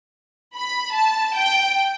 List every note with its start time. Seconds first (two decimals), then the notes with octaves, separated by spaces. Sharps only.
0.55 B5
0.94 A5
1.34 G5